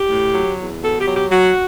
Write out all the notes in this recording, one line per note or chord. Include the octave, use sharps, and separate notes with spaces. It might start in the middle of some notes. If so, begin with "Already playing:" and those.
Already playing: G4
A2
F#3
E2
B2 A4
G4
F#3
G4
F#3 F#4